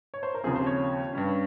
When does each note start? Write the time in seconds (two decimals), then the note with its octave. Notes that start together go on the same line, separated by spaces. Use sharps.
0.14 C#5
0.23 C5
0.34 A#4
0.44 D#2 C#3 F3 C4 G#4
0.55 C5
0.67 C#5
1.13 G2 G3 C#4